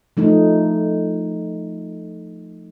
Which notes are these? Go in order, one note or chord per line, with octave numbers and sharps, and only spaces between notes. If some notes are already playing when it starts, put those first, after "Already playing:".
F3 A3 D#4